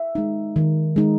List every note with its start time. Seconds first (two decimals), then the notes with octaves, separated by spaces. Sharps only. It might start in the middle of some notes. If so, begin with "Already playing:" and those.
Already playing: E5
0.15 G#3 D#4
0.56 D#3
0.96 G#3 D#4